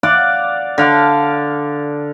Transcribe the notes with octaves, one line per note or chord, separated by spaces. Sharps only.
D5 F5 F#5 D6
D3 F5 D6